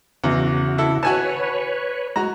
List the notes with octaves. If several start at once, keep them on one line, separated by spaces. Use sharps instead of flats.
E2 C#3 F#4
E4 A4
F#4 B4 C#5 G#5 A5
G#3 F#4 A#5